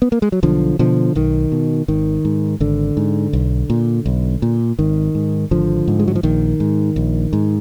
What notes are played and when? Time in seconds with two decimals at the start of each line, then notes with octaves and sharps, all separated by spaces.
0.02 B3
0.12 A#3
0.22 G#3
0.32 F#3
0.43 B1 D3 F3
0.79 B2 D3 F3
1.15 B1 D#3
1.52 B2
1.88 G#1 D#3
2.25 G#2
2.60 G#1 D3
2.97 G#2
3.33 B1
3.70 A#2
4.06 B1
4.42 A#2
4.79 G#1 D#3
5.15 G#2
5.51 G#1 D3 F3
5.88 G#2
6.00 G#3
6.08 F#3
6.16 F3
6.23 A#1 D#3
6.60 G#2
6.96 A#1
7.33 G#2